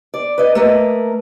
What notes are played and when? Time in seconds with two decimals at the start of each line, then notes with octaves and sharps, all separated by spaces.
0.14 D5
0.38 B4 D#5
0.55 A3 A#3 A#4 B4 D#5